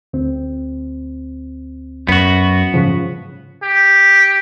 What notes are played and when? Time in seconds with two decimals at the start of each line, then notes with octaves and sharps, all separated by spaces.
0.13 D2 C4
2.08 F#2 B3 F#4
2.74 G#2 C#3 F3
3.63 G4